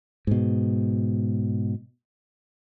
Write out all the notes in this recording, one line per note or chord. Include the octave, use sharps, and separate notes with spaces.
G#2 B2